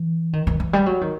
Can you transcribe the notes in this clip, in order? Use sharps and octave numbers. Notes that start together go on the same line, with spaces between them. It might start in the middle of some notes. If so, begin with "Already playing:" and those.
Already playing: E3
D#3
D#3
E3
G3
F#3
D#3